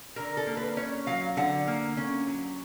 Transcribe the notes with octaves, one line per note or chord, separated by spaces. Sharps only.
D3 A#4
A4
A#3
B4
C#4 C#5
F#3 F5
D3 F#5
A#3
C#4
F#3